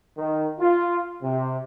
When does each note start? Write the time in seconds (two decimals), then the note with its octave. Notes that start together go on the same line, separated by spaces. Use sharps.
0.17 D#3
0.59 F4
1.23 C3